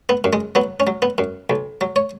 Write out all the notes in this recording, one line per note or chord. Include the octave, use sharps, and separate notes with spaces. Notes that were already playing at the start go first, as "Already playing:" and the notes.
B3
F#2
G#3
F#3 B3
C#4
F#3
B3
F#2
B1
F#3
C#5